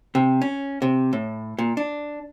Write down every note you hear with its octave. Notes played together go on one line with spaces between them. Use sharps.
C3
C#4
C3
A2
A#2
D4